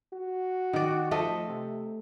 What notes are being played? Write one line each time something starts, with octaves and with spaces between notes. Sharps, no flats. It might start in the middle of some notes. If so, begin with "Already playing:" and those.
F#4
D#3 D5
F3 A3 D#5
C3